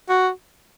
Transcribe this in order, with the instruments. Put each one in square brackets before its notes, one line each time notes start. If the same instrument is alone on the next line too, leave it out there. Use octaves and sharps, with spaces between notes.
[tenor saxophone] F#4